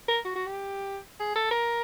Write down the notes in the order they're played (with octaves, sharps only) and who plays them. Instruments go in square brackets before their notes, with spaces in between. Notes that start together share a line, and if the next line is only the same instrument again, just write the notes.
[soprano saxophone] A#4
F#4
F#4
G4
G#4
A4
A#4